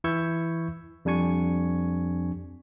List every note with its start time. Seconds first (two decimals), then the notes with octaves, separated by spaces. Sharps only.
0.04 E3 E4 C#6 E6 G6 G#6
1.05 F2 G3 D4 G#5 C#6 G#6